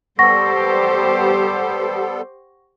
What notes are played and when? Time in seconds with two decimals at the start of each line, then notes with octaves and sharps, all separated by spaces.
0.19 G3 B3 G4 A4 C5 F#5 C#6 A#6